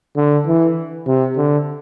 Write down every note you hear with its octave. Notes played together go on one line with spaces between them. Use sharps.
D3
E3
C3
D3